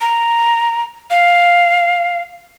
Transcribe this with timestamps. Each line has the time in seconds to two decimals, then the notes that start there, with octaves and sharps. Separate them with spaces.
0.01 A#5
1.10 F5